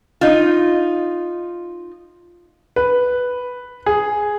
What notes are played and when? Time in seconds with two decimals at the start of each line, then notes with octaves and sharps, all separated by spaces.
0.21 D#4 F4
2.76 B4
3.86 G#4